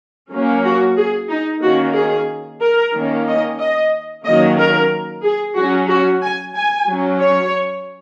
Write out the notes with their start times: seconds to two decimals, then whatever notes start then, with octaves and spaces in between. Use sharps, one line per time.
0.32 F#3 A#3 C#4
0.65 F#4
0.97 G#4
1.30 D#4
1.63 D#3 A#3 C#4 F#4
1.95 G#4
2.61 A#4
2.94 D#3 A#3 C#4
3.27 D#5
3.59 D#5
4.25 D#3 F#3 A#3 C#4 D#5
4.58 A#4
5.24 G#4
5.56 F#3 C#4 F#4
5.89 F#4
6.22 G#5
6.55 G#5
6.87 F#3 C#4
7.20 C#5